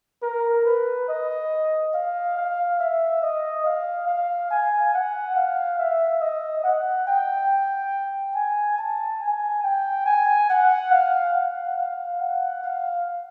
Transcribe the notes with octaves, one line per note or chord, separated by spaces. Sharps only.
A#4
B4
D#5
F5
F5
E5
D#5
F5
F5
G#5
F#5
F5
E5
D#5
F#5
G5
G#5
A5
G#5
G5
G#5
F#5
F5
F#5
F5
F#5
F5